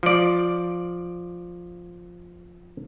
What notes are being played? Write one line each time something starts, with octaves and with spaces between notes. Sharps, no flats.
F3 D5